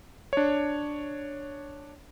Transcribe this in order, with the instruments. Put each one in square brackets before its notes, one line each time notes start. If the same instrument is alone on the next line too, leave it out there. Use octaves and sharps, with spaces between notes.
[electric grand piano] D4 C#5